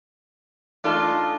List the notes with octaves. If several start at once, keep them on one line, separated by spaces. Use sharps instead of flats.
E3 A3 D4 D#4 F4 A4 A5 F6